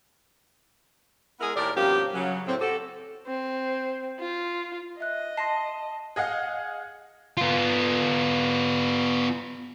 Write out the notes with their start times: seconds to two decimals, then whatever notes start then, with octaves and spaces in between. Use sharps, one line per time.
1.40 G#3 B3 E4 G#4 A#4
1.55 D#2 A2 G4 A#4 D5
1.75 G2 B2 F3 A#3 C#4 G4
2.14 C#3 F#3
2.46 A2 C4
2.60 F#4 G4 A4
3.27 C4
4.19 F4
5.00 D#5 E5 F#6
5.37 A5 C6 A#6 C7
6.16 G#4 D#5 F5 F#5
7.37 B3 F4